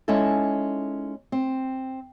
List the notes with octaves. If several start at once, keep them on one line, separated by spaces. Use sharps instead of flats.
G#3 C#4 D#4 E4 A4
C4